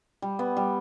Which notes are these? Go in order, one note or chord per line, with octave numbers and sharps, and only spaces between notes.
G3
B3
G3